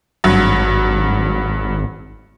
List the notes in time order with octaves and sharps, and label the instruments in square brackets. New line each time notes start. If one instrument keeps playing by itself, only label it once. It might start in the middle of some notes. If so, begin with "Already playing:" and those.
[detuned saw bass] G#1 [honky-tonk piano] G2 F#3